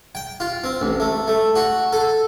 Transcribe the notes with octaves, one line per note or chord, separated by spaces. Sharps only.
G5
F4
C4
A1
A3
A3
F#4
A4